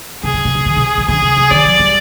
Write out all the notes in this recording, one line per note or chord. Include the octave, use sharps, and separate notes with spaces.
C3 G#4
B2
B2
C3
D3
B2
D#3
D3 G#4
C3
C3
D3 D5
F3
G3